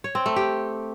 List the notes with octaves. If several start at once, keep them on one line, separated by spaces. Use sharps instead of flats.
C#5
C4
A3
G4